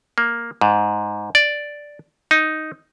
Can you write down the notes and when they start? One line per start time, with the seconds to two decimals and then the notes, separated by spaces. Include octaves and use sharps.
0.18 A#3
0.61 G#2
1.35 D5
2.31 D#4